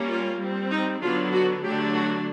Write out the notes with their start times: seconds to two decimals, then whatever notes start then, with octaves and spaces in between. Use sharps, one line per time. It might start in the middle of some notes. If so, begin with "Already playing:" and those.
Already playing: G3 A#3 C#4
0.08 F4
0.40 G3 C4
0.71 D#4
1.01 D3 F#3 B3 D4 F4
1.33 F#4
1.64 D3 F#3 A3 D4 G4
1.95 F#4